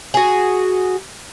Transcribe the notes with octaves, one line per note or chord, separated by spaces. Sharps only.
F#4 G#4